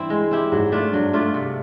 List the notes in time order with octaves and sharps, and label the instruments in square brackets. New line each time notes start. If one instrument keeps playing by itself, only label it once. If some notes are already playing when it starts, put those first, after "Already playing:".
Already playing: [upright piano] G2 [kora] E3 C4 E4
[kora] G#3
C4 E4 G4
[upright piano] G#2 [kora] F#3
[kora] A3 D4 F4
[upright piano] G2 [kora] F#3
[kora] A3 D4 F4
C3